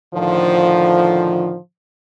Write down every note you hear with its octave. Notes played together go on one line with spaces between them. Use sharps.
A2 D3 D#3 F3